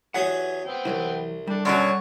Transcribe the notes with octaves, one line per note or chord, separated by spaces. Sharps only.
E2 F#3 G4 G#4 B4 F#5
B3 C4 G5
C2 E3 F#3 E4
G3 D4 A4
F#2 B2 F#3 C#4 D4 F#5 C#6